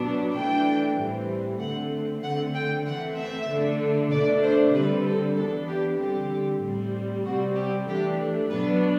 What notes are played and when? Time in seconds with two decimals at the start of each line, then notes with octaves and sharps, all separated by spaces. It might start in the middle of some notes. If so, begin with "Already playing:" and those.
Already playing: B2 F#3 B3 D4
0.35 E3 A3 D4 G5
0.98 A2 E3 G3 C4
1.60 D3 A3 C4 F#5
2.23 D3 A3 C4 F#5
2.55 G5
2.86 E3 A3 C4 F#5
3.17 E5
3.49 D3 A3 D4
4.11 B2 A3 D4 D5
4.43 C5
4.74 D3 G3 C4 B4
5.06 A4
5.37 E3 B3 D4 A4
5.68 G4
6.00 D3 G3 C4 G4
6.63 A2 G3 C4
7.25 C3 G3 C4 F#4
7.56 G4
7.88 E3 A3 D4 G4
8.50 B2 F#3 B3 D4 B4